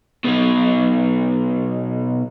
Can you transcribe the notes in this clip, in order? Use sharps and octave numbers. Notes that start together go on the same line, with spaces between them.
B2 D#4